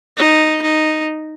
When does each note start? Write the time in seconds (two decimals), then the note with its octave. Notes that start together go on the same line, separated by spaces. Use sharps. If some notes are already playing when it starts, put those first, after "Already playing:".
0.17 D#4
0.62 D#4